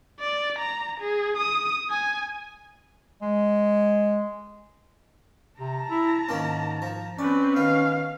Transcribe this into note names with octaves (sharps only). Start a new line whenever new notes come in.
D5
A#5
G#4
D#6
G#5
G#3
C3 A5 A#5
E4
G#2 D#3 A#3 C#4
F3
C4 C#4 B4 D5
D#3 B3 F5